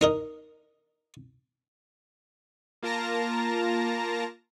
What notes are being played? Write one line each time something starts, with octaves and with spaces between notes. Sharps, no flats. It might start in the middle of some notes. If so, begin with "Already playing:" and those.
D#4 A#4 D#5
A#3 F4 A#4 A5 A#5 A#6